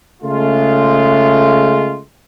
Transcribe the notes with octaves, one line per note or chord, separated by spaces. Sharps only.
C#3 G#3 A3 F4